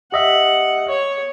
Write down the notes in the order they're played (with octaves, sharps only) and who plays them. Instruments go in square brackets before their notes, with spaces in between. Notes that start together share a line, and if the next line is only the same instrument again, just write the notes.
[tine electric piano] G4 D#5 E5 [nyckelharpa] F#5
[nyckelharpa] C#5